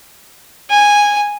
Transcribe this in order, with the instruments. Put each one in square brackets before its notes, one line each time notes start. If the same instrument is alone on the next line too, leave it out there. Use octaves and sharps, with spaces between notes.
[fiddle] G#5